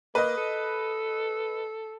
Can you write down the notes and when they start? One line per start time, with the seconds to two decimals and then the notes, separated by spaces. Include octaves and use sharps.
0.15 A#3 B4 D#5
0.37 A4